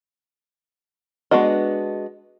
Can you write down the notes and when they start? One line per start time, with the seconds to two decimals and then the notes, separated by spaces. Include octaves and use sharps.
1.31 G#3 B3 D4 F#4 D#5